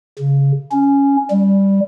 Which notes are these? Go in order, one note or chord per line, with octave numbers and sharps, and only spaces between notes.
C#3
C#4
G3